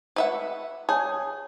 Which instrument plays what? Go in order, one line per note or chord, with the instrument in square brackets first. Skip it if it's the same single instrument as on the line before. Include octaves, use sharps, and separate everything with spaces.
[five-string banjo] B4 E5 F#5
[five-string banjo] G#4 [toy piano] C#5 A5